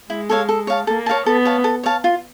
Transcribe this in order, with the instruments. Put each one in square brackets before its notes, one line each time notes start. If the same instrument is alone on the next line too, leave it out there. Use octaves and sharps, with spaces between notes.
[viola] G#3 [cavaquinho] E4
[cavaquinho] A4 C#5 F5
A4
C#5 F5 A5
[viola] A#3 [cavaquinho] A4
[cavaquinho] C#5 F5 A5
[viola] B3 [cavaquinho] A4
[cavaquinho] C#5 F5 A5
A4
C#5 F5 A5
F4